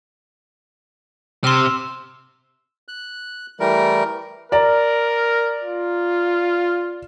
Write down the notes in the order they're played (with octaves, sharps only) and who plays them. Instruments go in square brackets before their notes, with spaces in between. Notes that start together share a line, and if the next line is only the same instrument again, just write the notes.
[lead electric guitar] C3 [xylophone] C6 F6 [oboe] E6
[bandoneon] F#6
E3 G3 A3 A#4
[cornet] A#4 [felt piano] D5 A#5
[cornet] F4